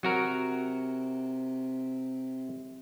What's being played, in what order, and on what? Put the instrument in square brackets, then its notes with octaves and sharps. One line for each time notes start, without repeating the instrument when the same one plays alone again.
[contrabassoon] C3 [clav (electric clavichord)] F#3 F#4 A#4